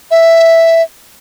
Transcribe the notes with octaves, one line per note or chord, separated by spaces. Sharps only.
E5